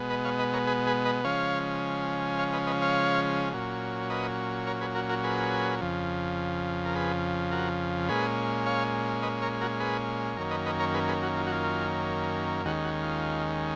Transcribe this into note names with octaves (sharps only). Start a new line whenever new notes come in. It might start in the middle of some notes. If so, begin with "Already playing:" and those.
Already playing: B2 G#3 B3
B4 D#5
C#5 F5
B4 D#5
A#4 C#5
G#4 B4
G#4 B4
B4 D#5
C#3 F3 G#3 C#4 C#5 F5
C#5 F5
B4 D#5
B4 D#5
C#5 F5
A#2 F#3 C#4
B4 D#5
A#4 C#5
G#4 B4
F#4 A#4
F#4 A#4
G#4 B4
F2 C#3 F3
A#4
G#4 B4
F#4 A#4
A#2 G#3 C#4 G#4 B4
C#5 F5
B4 D#5
A#4 C#5
F#4 A#4
G#4 B4
F#2 D#3 A#3 C#4 A#4 C#5
B4 D#5
B4 D#5
A#4 C#5
G#4 B4
G#4 B4
F#4
F4
F#4
F4
D#2 D#3 G#3 C#4 F#4
F#4
F4